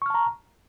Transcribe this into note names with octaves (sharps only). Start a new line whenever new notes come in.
A5 A#5 C#6 F6